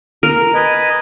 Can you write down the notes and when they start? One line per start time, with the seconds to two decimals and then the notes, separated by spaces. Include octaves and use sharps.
0.23 A#4
0.54 B4 D#5 G#5